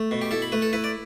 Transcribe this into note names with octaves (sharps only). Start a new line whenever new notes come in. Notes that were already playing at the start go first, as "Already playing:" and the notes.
Already playing: A3
B2
G4
E4 A4
B5
A3 B4
A4
E4 B4
D5